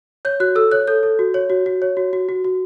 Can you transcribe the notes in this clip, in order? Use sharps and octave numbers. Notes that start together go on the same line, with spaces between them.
C#5 G6
F#4 F#6
A4 E6
C#5 F#6
A4 G6
A4
F#4
C#5
F#4
F#4
C#5
F#4
F#4
F#4
F#4